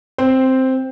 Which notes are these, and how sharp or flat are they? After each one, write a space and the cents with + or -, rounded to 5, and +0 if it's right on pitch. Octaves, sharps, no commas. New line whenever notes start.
C4 +0 C5 +0